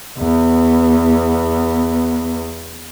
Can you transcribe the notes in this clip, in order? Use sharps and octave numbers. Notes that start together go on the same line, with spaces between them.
E2 B3